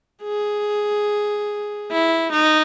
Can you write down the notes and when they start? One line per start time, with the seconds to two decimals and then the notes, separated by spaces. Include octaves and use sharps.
0.24 G#4
1.91 E4
2.33 D#4